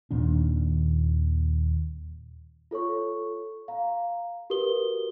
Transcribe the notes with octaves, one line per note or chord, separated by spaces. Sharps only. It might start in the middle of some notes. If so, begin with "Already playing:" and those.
D#2 A#2 D#3 D4
F4 A4 C#5 C#6
F5 A#5
F#4 G4 A#4 B4 D#6 G7